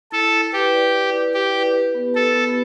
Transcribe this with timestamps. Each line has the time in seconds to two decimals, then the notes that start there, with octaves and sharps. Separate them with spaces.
0.12 E4 A4
0.33 E4
0.52 G4 B4
0.73 D5
0.93 D5
1.14 E4
1.34 E4 G4
1.54 B4
1.75 G4
1.94 B3
2.14 G4 A4
2.35 B3